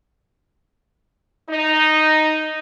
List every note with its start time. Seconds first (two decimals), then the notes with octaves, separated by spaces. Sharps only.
1.50 D#4